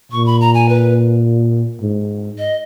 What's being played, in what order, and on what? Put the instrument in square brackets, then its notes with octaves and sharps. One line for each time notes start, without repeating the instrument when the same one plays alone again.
[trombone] A#2 [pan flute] C#6
[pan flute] B5
A#5
G#5
B4
[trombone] G#2
[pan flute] D#5